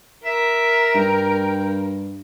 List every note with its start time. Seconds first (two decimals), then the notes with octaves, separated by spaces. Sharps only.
0.24 A#4 E5
0.95 G2 G5